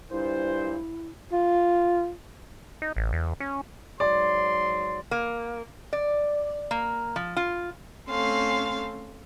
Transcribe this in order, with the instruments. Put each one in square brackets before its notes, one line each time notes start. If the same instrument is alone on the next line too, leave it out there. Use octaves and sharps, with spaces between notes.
[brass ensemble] G2 A#2 C5 [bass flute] E4
[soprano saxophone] F4
[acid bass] D#4
A1
E2
C#4
[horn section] G#2 F#3 C6 [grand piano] D5
[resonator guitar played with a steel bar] A#3
D5
A#3
F3
F4
[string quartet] A3 C4 C#4 A4 F5 C6